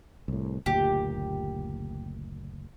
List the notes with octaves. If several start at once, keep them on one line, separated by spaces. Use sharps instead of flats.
C2 A2
F#1 D2 A#2 G4